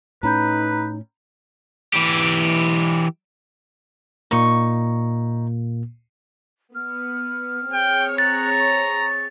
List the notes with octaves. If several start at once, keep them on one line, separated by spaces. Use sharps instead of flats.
A2 C#4 D#4 B4 A#5 B5 G6
E3 G4
A#2 A#3 D#4 C#6
B3 F6
C4 G#4 C#5 G5
A#5 F#6 A6
C#6